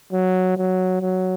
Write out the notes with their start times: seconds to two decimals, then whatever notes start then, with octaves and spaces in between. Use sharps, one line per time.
0.13 F#3
0.57 F#3
1.01 F#3